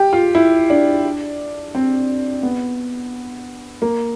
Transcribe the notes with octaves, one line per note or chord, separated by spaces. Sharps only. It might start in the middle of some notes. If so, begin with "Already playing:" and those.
Already playing: G4
F4
E4
D4
C4
B3
A#3